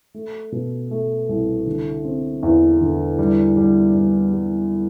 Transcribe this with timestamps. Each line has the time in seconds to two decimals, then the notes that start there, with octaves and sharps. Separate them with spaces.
0.14 A3
0.52 B2
0.91 A3
1.29 C2
1.67 D3
2.04 C4
2.43 E2
2.81 D3
3.19 G3
3.57 G3
3.94 G3
4.33 G3